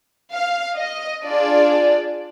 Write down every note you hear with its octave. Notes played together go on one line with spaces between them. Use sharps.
F5
D#5
D4 F4 G#4 D5